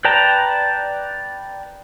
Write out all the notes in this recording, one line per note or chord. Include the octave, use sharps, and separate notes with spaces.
B4 D5 G5 A5 A#5